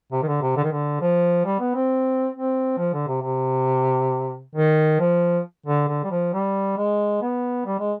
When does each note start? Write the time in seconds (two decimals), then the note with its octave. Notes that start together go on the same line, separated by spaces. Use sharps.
0.12 C3
0.23 D#3
0.27 D3
0.42 C3
0.57 D3
0.64 D#3
0.72 D3
1.01 F3
1.45 G3
1.60 B3
1.75 C4
2.34 C4
2.78 F3
2.94 D3
3.08 C3
3.22 C3
4.55 D#3
5.00 F3
5.66 D3
5.88 D3
6.04 G3
6.11 F3
6.33 G3
6.77 G#3
7.21 B3
7.66 G3
7.79 G#3